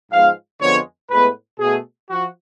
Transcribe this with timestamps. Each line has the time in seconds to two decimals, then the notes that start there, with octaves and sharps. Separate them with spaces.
0.12 G#2 F3 G#3 B3 F5
0.61 F2 D3 F3 G#3 B3 C#5
1.11 A2 G#3 B3 B4
1.60 B2 A3 G#4
2.09 F3 F#4